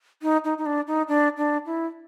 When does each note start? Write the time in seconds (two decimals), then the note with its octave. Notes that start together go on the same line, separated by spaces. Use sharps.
0.22 D#4
0.44 D#4
0.58 D#4
0.66 D4
0.87 D#4
1.08 D4
1.38 D4
1.66 E4